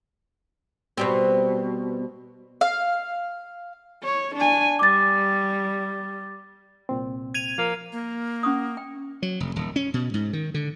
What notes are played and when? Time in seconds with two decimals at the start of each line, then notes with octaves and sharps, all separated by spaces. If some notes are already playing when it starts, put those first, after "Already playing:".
0.98 B2 G3 C4
2.61 F5
4.03 C#5
4.36 D4 G#5
4.79 G3 D6 A6
6.89 C2 A#2 C4
7.34 G#6 D#7 F7
7.58 F3 A#3
7.92 A#3
8.43 C#4 C#6 D#6
8.77 G5
9.22 F#3
9.40 F1
9.56 D#1
9.76 C#4
9.94 B2
10.14 G#2
10.33 D#3
10.54 D3